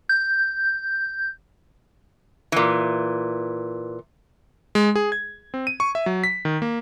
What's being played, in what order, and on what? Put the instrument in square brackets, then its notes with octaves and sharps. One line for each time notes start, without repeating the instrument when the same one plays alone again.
[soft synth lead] G6
[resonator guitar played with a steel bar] A#2 E3
[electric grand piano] G#3
G#4
G#6
C4
D#7
C#6
E5
F#3
B6
D#3
A#3